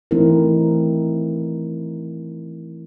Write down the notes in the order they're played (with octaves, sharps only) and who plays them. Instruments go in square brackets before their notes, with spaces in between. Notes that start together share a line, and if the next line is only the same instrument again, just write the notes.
[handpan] E3 A3 C4 D#4 E4 A#4